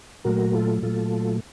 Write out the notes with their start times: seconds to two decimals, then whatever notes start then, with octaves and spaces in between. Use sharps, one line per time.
0.25 A#2 F#3 A3 F#4 A#4
0.54 F4 A4
0.82 A#2 F#3 A3 F4 A4